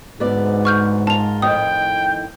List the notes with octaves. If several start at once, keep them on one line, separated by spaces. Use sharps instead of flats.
D2 G#2 B3 D5
C#6 F6 G6
F4 A#4 A5 F7
F2 A2 D#3 G5 D#6